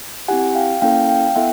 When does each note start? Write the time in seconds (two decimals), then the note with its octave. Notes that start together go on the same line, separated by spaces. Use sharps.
0.28 C4 E4 G4 F#5 G#5
0.55 F5 G5
0.82 A#3 C#4 E4 A4 F5 G5
1.09 F5 G5
1.27 G5
1.36 B3 E4 A4 E5 F#5